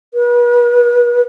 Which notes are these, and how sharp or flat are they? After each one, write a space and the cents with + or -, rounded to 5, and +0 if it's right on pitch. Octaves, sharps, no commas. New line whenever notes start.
B4 -40